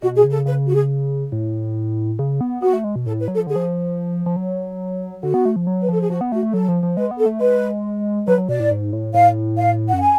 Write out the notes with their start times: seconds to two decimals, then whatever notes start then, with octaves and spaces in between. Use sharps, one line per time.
0.02 B2 F#4
0.16 G#4
0.24 C#3
0.31 A4
0.46 C#3 B4
0.68 F#4
0.74 G#4
1.32 A2
2.19 C#3
2.41 B3
2.62 B3 F#4
2.73 A3
2.84 G#3
2.95 B2
3.06 A2 A4
3.20 B4
3.28 F#3
3.35 F3 A4
3.47 D3 G#4
3.56 F3
4.26 F3
4.36 F#3
5.23 D3 F#4
5.34 B3
5.45 A3
5.56 F3
5.67 F#3
5.81 B4
5.89 F3 A4
6.01 G#4
6.10 F3 F#4
6.21 B3
6.32 A3 F#4
6.43 A3
6.53 F#3 A4
6.68 F3
6.83 F3
6.97 G#3 B4
7.11 B3
7.19 A4
7.26 A3
7.40 G#3 B4
8.27 F#3 B4
8.38 F#3
8.49 B2 D5
8.60 A2
8.71 G#2
8.93 A2
9.14 A2 F5
9.57 F5
9.89 F#2 F#5
10.01 G#5